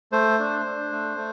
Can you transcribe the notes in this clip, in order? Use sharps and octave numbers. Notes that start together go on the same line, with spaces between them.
A3 C5
D4
D4
A3
A3